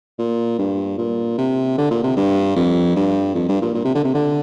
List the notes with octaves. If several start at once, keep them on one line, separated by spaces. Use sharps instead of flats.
A#2
G2
A#2
C3
D3
A#2
C3
G2
F2
G2
F2
G2
A#2
A#2
C3
D3
C3
D3